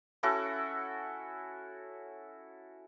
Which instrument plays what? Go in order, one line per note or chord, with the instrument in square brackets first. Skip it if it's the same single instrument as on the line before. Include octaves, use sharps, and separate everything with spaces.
[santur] C#4 E4 F#4 A4